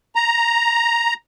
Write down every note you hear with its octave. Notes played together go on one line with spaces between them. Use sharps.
A#5